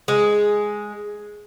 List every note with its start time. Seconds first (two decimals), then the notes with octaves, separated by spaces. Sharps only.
0.08 G#3